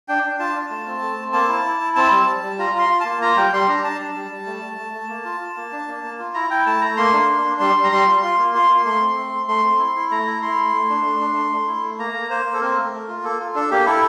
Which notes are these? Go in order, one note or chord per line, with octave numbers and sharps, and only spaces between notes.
D4 G5
D4
F4 A5
F4
A3
C4
A3
C4
A#3 A5
E4
E4
E4
C4 A5
G3
G3
G3
F4 A#5
F4 C6
F4
A#3 A5
F4 A#5
G3 G5
G3 C6
D4 A#5
D4 A5
G3
G3
G3
A3
A3
A3
A3
A#3
F4
F4
A#3
D4
A#3
A#3
F4
E4 A#5
E4 G5
A3 A5
A3 A#5
A#3 C6
D4
A#3
D4
G3 C6
G3
A#5
G3 C6
F4
F4 C6
A#3
F4 C6
A#3
A3 C6
C4
A3
A3
A3 C6
C4
E4
E4
A3 A#5
E4
E4 C6
A3
A3
D4
A3
D4
A3
A3
E4
A3
A#3 A#5
A#3
A#3 C5
A#3
A4
C4 A#4
A3
A3
F4
A#3 A4
F4
D4 A4
A#3 G4
E4 A4